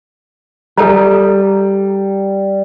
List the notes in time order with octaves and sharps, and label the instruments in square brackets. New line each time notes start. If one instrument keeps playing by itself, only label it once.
[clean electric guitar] G3 [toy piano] A4 A5 A#5